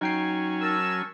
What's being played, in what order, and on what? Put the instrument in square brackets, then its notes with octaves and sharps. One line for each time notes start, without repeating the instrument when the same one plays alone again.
[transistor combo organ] F#3 C#4 G#5 [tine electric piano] D#4 G5 C7
[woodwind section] A#4 A5 E6